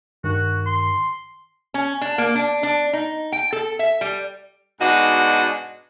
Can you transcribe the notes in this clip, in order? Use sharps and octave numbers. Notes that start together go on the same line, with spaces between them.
G2 D#3 F#4
C6
C#4
D4
A#3
D4
D4
D#4
G5
A4
E5
G3
G#2 B2 D4 D#4 F#4